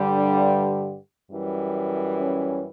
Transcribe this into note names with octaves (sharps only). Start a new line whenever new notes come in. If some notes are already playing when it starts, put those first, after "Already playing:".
Already playing: G2 D3 G3
F#2 E3 G3
C#4